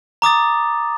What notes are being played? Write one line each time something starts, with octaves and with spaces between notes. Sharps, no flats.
A#5 D6 D#6 A6